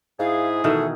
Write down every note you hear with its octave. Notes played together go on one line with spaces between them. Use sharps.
G#2 E4 G#4 F5
B2 D#3 E3 A3 A4